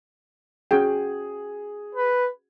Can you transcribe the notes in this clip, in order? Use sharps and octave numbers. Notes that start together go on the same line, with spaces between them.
C#4 F#4 G#4 G5
B4